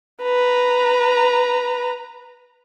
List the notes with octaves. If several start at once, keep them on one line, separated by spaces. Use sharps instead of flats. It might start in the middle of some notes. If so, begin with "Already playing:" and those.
B4 A#5